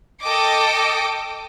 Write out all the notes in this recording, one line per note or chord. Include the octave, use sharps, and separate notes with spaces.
A4 D#5 G5 D6